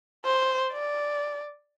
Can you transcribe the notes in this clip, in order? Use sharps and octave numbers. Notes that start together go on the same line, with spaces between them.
C5
D5